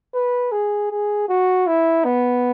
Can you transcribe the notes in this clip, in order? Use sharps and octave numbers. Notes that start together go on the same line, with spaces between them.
B4
G#4
G#4
F#4
E4
B3